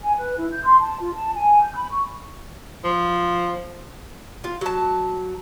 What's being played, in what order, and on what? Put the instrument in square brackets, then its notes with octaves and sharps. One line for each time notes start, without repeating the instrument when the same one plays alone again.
[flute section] G#5
B4
E4
G6
C6
A5
F4
A5
G#5
G6
B5
C#6
[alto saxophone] F3
[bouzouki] F4
F#3 A5